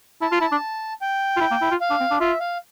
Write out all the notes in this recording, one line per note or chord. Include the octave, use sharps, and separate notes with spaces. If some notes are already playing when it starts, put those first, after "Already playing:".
E4 A5
F4
E4
D4
G5
F4
E4
A#3
E4
F4
F5
D4
C4
D4
F4 E5
F5